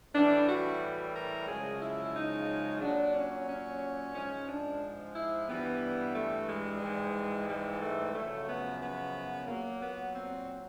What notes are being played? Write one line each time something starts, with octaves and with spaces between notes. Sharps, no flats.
A2 E3 G3 D4
F#4
A#4
F#2 C#3 F3 G#3 G#4
E4
D#4
A#2 F#3 D4
C#4
C#4
G#2 F3 G#3 C#4
D4
E4
G2 E3 G3 B3
A3
G#3
G#2 E3 G3
G#3
A3
F#2 C#3 F3 A3
B3
B3
A#2 F#3 A#3
B3
C4